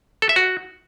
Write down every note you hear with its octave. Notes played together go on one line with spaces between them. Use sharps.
A4
E5
F#4